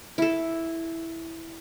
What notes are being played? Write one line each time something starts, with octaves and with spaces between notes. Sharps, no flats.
E4 A4